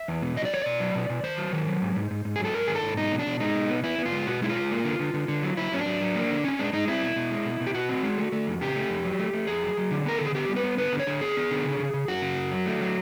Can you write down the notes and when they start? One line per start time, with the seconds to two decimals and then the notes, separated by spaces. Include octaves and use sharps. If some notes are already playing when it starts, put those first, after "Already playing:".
Already playing: E5
0.08 E2
0.22 B2
0.36 F#3 D#5
0.45 D5
0.52 E2 C#5
0.62 B2 D5
0.80 F#3
0.95 B2
1.10 B2
1.23 D#3 C5
1.38 F#3
1.52 D#3
1.67 F#3
1.82 G#2
1.96 G#2
2.11 G#2
2.25 G#2
2.36 F#3 G#4
2.45 A4
2.54 G#2 A#4
2.67 D#3 G#4
2.75 A4
2.83 G#2
2.97 B2 D#4
3.12 B2
3.19 D4
3.26 B2
3.40 G#3 D#4
3.55 B2
3.69 B3
3.84 B3 E4
3.98 B3
4.05 F4
4.12 G#3
4.27 B2 F#4
4.42 G#3 E4
4.49 F4
4.56 G#3
4.71 A#3
4.85 D3
4.99 D3
5.14 D3
5.28 D3
5.43 F#3
5.57 F#3 E4
5.72 F#3 C#4
5.79 D4
5.86 F#3
6.01 F#3
6.15 A#3
6.30 D3
6.44 C4 C#4
6.59 G#3 D4
6.73 G#3 D#4
6.88 C4 E4
7.02 B2
7.16 B2
7.31 G#3
7.45 B2
7.60 B2
7.67 G4
7.74 B2 F#4
7.89 C4
8.03 G#3
8.18 A3
8.32 A3
8.47 F2
8.61 C#3 G4
8.76 A3
8.89 F2
9.05 F#3
9.19 A3
9.33 A3
9.47 F2 G#4
9.63 F#3
9.77 F#3
9.91 D3
10.06 B3 A#4
10.17 D3 A4
10.25 G#4
10.34 B3 G4
10.49 G3
10.56 B4
10.64 B3
10.78 D3 B4
10.92 D3
10.99 C#5
11.07 D3
11.21 B3 G#4
11.36 B3
11.51 D3
11.65 C#3
11.80 C#3
11.94 C#3
12.08 F#2 F#4
12.22 C#3
12.37 F#2
12.52 F#3
12.66 A3
12.81 F#3